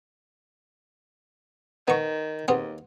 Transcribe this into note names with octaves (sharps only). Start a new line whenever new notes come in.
D#3 B3 C#6
D#2 B3 C4 G#4